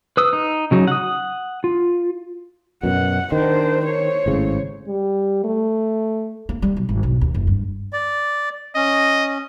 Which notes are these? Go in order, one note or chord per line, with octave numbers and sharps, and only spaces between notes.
B4 D#6 E6
D#4
C#3 F#3 D#4
F#5 D#6
F4
F#2 B2 F#5
D#3 D4 C5
C5 C#5
G#1 A2 C#3
G3
A3
A#3
G3
B1
G#1
B1
D#2
F#1
G2
D5
C#4 D#5